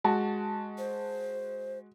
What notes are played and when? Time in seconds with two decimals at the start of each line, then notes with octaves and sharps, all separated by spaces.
0.04 G#3 F#4 A5
0.78 C5